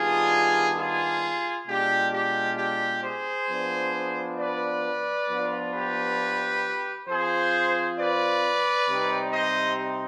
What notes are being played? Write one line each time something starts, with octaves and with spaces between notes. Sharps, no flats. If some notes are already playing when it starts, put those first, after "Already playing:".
Already playing: D#3 G3 B3 D4 F4 G#4
F4 G#4
B2 G#3 D4 F4 G4
G4
G4
G#4 C5
F3 B3 D4
B4 D5
F3 B3 D4 F4
G4 B4
F3 C4 F4 G#4 C5
B4 D5
C3 G3 C4 D#4
C5 D#5